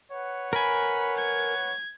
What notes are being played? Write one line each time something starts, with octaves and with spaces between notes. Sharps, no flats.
B4 C#5 F#5
A#4 G#5 B5
G#6